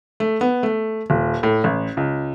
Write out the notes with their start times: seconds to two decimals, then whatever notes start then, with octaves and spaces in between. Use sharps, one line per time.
0.20 A3
0.41 B3
0.63 A3
1.10 D#1
1.43 A2
1.64 A1
1.97 C#2